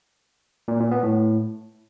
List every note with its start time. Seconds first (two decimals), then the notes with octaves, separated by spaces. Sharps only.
0.68 A#2
0.80 A#2
0.91 B3
1.03 A2